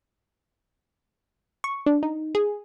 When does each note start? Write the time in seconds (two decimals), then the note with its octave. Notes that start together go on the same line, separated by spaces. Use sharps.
1.64 C#6
1.86 D4
2.03 D#4
2.35 G#4